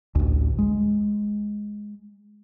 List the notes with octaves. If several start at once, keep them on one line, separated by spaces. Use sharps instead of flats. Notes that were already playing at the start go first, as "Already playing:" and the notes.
A1 D2
G#3